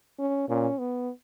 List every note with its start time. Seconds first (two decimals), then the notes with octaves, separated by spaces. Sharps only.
0.20 C#4
0.49 A#2 C#4
0.79 B3